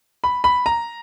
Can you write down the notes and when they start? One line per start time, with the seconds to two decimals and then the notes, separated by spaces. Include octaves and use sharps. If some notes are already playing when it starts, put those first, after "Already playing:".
0.24 B5
0.44 B5
0.66 A#5